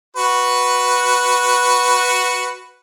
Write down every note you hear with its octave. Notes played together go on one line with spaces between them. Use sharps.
F#4 B4